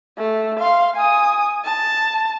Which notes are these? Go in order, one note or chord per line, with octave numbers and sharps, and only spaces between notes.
A3
F5 C6
G#5 D#6
A5